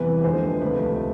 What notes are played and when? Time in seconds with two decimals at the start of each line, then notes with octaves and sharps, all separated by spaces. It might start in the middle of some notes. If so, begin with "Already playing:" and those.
Already playing: E2 C3 E3 G3 B4
0.24 D#2 D3 F3 G#3 C5
0.61 C#2 C3 F3 A3 B4